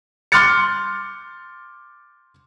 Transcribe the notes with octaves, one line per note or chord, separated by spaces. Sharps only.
C6 D6 F6 F#6 A6 C#7